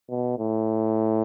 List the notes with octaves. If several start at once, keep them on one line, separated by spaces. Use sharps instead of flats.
B2
A2